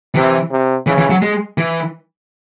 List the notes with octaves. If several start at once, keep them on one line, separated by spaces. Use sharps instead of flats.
C3 E3
C3
C#3 E3
E3
F#3
G#3
E3